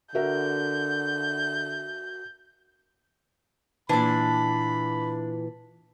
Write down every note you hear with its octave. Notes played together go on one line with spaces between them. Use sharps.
D3 F#4 A#4 E5 G6
A#2 E3 D4 B5